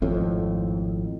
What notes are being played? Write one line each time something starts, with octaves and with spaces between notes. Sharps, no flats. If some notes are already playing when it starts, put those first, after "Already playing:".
G#1 F2 A2